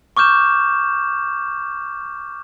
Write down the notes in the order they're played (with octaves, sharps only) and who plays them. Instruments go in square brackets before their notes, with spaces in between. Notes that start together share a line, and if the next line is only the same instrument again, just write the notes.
[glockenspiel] C#6 D6 F6 G6 E7